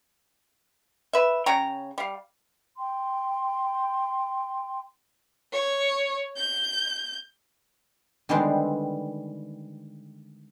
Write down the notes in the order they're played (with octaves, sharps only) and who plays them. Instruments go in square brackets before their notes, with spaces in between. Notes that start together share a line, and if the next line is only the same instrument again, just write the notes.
[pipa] B4 E5
C#3 C#5 G5 A#5
G3 F5
[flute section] G5 C6
[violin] C#5
G6
[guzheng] D3 D#3 G3 G#3 B3 C4